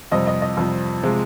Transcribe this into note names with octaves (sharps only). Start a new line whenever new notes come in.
F2 C3 G3 D#5
D#5
D#5
F2 C3 G3
C3 F3 G#3